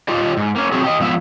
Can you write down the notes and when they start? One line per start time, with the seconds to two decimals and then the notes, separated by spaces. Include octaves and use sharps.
0.08 F4 G4 D5 D#5
0.37 G#2
0.56 A#3 C#4
0.72 F#3 C4 F#4 G#4
0.84 G4 D#5
1.00 G#2 F3 B3 E5